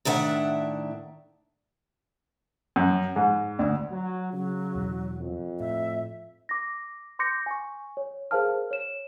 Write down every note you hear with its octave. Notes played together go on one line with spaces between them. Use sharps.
A2 D#3 D4 E5 F#5
F#2
G#2
D2
F#3
C#3 F#3
E2 B2 E3
F2
A2 E5
D6 A#6
C6 D6 G6 A#6 C#7
G#5 C#6
C#5
G#4 A#4 C5 F5 A5 F6
C#5 E7